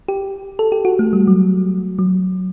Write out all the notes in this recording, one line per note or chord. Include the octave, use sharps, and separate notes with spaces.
G4
A4
G4
F#4
A3
G3
F#3
F#3